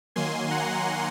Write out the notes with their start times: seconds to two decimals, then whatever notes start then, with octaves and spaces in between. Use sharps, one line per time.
0.16 D#3 F#3 A#3 G#5 C6
0.51 F#5 A#5